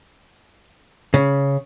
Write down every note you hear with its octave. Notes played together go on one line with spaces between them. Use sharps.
C#3